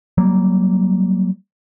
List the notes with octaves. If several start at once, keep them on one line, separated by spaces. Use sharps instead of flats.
F#3 G3 A#3